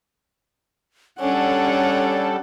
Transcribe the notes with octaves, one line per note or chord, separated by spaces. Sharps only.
G3 C#4 D4 A4 C#5 F#5